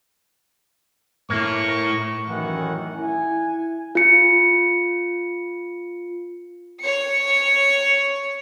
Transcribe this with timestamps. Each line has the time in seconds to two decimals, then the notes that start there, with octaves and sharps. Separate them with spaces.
1.30 A2 A#3 E4 C#6
1.68 A#4
2.27 A1 F#2 D#3 E3 F#5
2.96 E4 G#5
3.95 F4 C#7
6.81 C#5 C#7